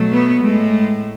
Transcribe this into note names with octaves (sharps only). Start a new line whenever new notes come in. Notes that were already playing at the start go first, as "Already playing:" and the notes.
Already playing: B2 F#3 A3
B3
A2 G#3 A3